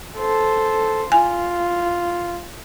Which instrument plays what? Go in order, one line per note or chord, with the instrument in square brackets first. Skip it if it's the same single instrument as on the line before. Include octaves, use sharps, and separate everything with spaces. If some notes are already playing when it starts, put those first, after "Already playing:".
[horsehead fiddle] A4 C5
[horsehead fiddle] F4 [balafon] G#5